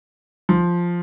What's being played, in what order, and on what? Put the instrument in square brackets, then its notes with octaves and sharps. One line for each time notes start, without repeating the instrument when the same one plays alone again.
[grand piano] F3